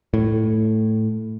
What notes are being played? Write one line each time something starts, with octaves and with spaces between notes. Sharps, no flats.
A2